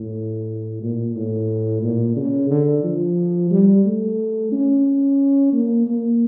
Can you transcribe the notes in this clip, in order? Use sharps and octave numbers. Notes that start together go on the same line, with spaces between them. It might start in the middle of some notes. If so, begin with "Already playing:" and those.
Already playing: A2
A#2
A2
A#2
C#3
D3
F3
G3
A3
C#4
A#3
A#3